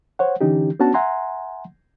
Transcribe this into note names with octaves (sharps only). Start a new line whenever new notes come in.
C5 C#5 F#5
D3 E3 C#4 D#4 G4
B3 C#4 D4 F#4 A5
E5 F#5 G#5 A#5 C6